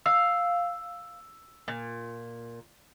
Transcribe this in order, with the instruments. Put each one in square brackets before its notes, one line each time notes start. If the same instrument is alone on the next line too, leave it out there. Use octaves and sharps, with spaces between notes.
[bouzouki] F5 [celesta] E6
[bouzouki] A#2